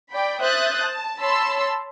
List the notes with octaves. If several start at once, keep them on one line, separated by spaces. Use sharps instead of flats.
D5 G5 B5
C5 E5 D#6 F#6 G6 A6
A5
C#5 A5 B5 C6 E6